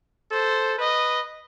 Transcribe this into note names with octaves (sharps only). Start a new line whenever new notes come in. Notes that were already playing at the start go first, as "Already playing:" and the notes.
A4 C5
B4 D#5